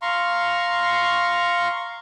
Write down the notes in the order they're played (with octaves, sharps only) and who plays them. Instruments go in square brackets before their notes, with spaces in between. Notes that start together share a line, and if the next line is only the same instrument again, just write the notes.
[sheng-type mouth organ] F5 A#5 C6 C#6